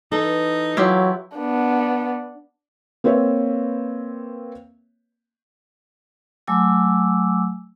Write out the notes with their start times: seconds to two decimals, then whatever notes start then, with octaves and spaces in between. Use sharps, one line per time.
0.12 E3 D#4 A4
0.77 F#3 E4 F4 G4
1.37 B3 D4
3.04 A#3 C4 B4 C#5 E5
6.47 F#3 A3 G#5 D6 E6